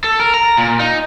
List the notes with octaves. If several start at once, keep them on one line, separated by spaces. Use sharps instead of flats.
A4
A#4
A#5
A#2
D#4